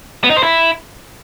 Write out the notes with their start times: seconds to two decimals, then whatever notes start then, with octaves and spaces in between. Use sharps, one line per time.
0.24 B3
0.30 D#4
0.37 C5
0.43 E4